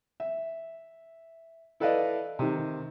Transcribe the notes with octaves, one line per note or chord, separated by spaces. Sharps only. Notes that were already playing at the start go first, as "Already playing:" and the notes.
E5
E4 A4 B4 D5 D#5 F5
C3 D#3